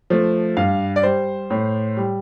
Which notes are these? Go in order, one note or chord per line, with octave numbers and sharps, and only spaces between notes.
F3 A3
G2 F5
D5
G3 C5
A2
G3